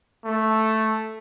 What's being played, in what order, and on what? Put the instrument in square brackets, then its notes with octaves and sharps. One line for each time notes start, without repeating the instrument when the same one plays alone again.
[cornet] A3